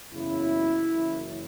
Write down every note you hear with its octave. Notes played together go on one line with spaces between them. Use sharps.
F#1 E2 C#3 F#3 E4
F#1 F#2 E3